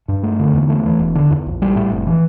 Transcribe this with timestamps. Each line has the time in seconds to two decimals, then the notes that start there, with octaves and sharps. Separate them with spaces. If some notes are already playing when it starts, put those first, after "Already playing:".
0.08 G2
0.23 A3
0.39 D3
0.54 E2
0.70 A3
0.85 E3
0.99 E1
1.15 D3
1.31 E2
1.46 A#1
1.62 G3
1.76 A2
1.92 F1
2.07 E3